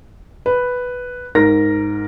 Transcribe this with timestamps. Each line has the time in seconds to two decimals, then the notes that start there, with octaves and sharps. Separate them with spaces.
0.46 B4
1.35 G#2 A#4 A#6